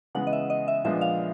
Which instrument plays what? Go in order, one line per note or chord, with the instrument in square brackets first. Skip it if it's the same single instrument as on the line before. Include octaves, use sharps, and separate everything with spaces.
[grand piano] C#3 E3 G#3 B3 [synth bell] F#5
[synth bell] D#5
E5
D#5
E5
[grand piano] A#2 F3 G#3 B3 D4 [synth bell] E5
[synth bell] F5